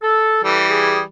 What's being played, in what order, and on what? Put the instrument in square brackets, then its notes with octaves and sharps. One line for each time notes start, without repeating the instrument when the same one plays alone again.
[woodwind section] A4
[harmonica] E3 G3 [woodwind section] A4
[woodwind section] G#4